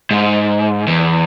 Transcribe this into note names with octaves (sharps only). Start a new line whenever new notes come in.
G#2
E2